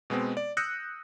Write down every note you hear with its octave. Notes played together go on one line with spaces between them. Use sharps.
B2 G#3 B3 C4
D5
D#6 E6 F#6 G6 A#6 C#7